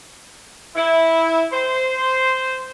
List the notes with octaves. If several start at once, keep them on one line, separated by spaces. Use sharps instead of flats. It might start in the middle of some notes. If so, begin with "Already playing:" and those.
E4
C5